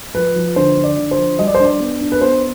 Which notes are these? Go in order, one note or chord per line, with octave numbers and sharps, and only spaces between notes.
F3 B4
F3
D3 C5
D3
D5
D3
C5
F3
G3 D#5
D5
C5
D4 D5
B3
D4
B4
B3 C5